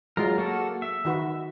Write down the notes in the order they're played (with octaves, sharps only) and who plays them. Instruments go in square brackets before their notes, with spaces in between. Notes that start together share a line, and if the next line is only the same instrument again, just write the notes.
[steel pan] F#3 G#3 [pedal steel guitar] F4 A#4
[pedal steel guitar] A#3 F#4 A4
E5
[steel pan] D#3 F#4 B4